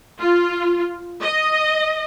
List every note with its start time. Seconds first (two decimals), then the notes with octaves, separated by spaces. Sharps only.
0.20 F4
1.20 D#5